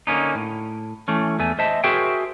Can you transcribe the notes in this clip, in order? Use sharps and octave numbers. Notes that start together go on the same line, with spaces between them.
D3 A#3 C#4 D#4
A2
E3 A3 C#4
E2 A3 G#5
C5 D#5 E5 A5
F#4 G#4 A#4 C5 E5 G5